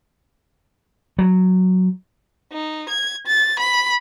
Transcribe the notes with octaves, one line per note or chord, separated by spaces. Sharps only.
F#3
D#4
G#6
A6
B5